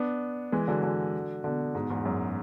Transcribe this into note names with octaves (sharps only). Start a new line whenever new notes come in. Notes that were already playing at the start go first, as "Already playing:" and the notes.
Already playing: B3 D4
E3 G#3
D3 F#3
D3 F#3
B2 D3
G#2 B2
E2 G#2
F#2